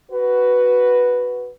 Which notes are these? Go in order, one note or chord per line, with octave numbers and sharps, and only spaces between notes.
F#4 B4